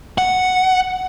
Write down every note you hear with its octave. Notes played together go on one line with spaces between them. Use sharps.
F#5